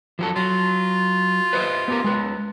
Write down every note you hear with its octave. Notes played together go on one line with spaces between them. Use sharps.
F3 F#3 A4
F#3 F4
B4 C5 D#5
B3 G4 A#4
G#3 B4